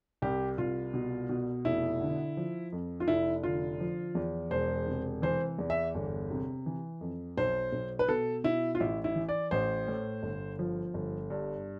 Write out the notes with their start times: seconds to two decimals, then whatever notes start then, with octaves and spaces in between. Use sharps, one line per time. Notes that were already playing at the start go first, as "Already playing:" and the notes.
0.22 C2 G4
0.58 C2 F4
0.94 B2
1.29 B2
1.65 F1 E4
2.01 D3
2.37 F3
2.72 F2
3.00 F4
3.08 F1 E4
3.43 D3 F4
3.80 F3
4.15 E2
4.51 E1 C5
4.86 C3
5.22 E3 C5
5.59 E2
5.70 E5
5.95 G1
6.30 C3
6.66 E3
7.01 F2
7.37 B1 C5
7.72 B1
7.99 B4
8.08 B2 A4
8.44 B2 E4
8.75 F4
8.80 A1 E4
9.04 E4
9.15 E3
9.29 D5
9.51 A1 C5
9.88 A2
10.23 G1
10.59 F3
10.94 G1
11.30 G2